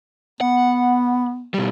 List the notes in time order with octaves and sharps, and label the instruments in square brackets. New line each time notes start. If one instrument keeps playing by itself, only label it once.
[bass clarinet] B3 [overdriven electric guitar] F#5
[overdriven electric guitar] B2 G3